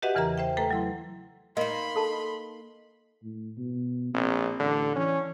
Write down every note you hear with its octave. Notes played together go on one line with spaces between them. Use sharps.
F#4 G4 B4 D#5 E5 F#5
E2 C#3 E3 A#4 E5 A#5
C5 E5 G5
A3 A4 B4 G5 A#5
F#3 E4 C6
A#3 D#4 D#5 B5 C6
A4 A5
A2
B2
A#1 C4
A1 D3
E3 C#4